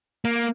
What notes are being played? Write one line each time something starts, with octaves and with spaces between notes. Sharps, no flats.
A#3